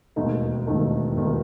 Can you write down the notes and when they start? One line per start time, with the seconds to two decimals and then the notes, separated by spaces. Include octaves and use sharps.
0.16 E1 D#2 D#3 A3 D#4
0.66 E1 D#2 D#3 A3 D#4
1.17 E1 D#2 D#3 A3 D#4